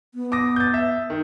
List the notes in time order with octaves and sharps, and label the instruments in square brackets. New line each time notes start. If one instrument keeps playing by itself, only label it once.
[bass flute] B3
[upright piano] D6 D#6 A#6
G6 A6
E5
D#3